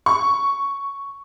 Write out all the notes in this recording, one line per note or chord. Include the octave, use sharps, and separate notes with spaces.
C#6